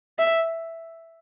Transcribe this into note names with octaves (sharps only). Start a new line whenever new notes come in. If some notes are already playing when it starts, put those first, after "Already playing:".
E5